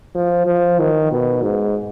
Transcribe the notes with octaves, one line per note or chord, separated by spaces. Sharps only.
F3
F3
D#3
B2
G#2